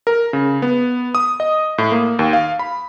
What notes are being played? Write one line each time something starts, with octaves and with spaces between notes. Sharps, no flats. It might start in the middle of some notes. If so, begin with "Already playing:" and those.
A#4
C#3
B3
D#6
D#5
A2
A#3
D#2
F5
B5